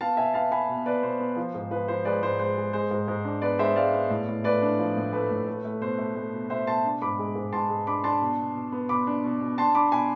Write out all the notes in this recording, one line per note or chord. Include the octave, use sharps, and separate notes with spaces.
B3 F5 A5
B2 E5 G#5
B3 F5 A5
B3 G#5 B5
B2
B2 B4 D5
B2 C5
B3
F3
G#2
F3 B4
F3 C5
G#3 B4 D5
G#2 C5
G#3 C5
G#3
G#3 C5
G#2
G#2
D4
B3 B4 D5
G#3 C5 E5
G#3 D5 F5
B3
A2
A2
A3 B4 D5
D4
F3
A2
A3 B4
A2
A3
A3
B2 C5
A3
A3
B2
B2 C5 E5
B2 A5 C6
D4
G#2 B5 D6
G#3
G#2
G#2 A5 C6
G#3
D4 B5 D6
D4 A5 C6
B2
B2
B2
B3
B2 B5 D6
D4
B2
B2
D4 A5 C6
D4 B5 D6
B2 G#5 B5